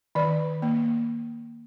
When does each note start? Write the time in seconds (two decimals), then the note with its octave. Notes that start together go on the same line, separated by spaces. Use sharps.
0.15 D#3 D5
0.62 A#3